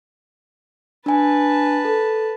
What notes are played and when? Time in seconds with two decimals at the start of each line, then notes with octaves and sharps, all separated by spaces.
1.06 D4 B4 G#5 A5
1.85 A4